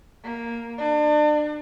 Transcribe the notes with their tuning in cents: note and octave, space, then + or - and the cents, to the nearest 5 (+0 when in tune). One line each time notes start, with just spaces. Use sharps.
A#3 +0
D4 +35